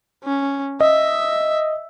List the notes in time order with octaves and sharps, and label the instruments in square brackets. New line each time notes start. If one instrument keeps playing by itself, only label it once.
[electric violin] C#4
[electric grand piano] D#5 [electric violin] E5